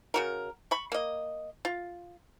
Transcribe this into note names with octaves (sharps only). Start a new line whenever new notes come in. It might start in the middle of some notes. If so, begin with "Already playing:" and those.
C#3 F#4 A#4
B5 C#6
A#3 D#5
F4